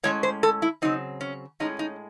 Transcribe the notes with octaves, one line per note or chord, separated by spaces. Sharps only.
A2 G#3 C#4 C#5
C5
A4
E4
C#3 F#3 C4 D#4
C#4
A2 G#3 C#4 D#4
D#4